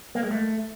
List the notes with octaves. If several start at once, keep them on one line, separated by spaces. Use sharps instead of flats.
A#3
G#3
A3